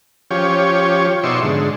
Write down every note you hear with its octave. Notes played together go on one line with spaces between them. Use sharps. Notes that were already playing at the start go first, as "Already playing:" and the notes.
F3 C#4 G4 C#5
B2 D#4 D5 E5 C6 C#6
G#2 D3